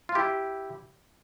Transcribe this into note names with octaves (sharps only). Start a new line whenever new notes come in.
F4
E4 G4